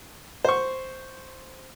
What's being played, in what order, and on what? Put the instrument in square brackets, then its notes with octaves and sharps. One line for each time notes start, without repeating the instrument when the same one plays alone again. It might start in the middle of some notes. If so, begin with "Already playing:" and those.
[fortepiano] C5 C#6